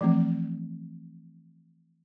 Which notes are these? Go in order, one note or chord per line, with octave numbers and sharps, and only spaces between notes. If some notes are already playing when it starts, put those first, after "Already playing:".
E3 F3 A3 C4